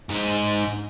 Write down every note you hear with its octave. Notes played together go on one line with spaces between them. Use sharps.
G#2 D#4